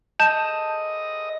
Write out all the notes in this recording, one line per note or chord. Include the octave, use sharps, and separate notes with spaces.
D#5 A5 G6 E7